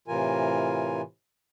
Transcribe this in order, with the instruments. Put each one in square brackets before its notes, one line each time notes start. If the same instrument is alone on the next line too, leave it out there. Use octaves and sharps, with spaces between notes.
[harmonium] A2 C3 E3 F4 A#4 G#5